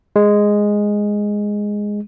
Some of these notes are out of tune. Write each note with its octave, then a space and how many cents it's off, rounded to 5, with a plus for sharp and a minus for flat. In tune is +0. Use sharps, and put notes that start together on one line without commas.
G#3 -5